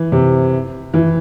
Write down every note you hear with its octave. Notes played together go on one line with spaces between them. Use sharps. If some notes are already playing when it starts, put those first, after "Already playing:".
Already playing: E3
C3
E3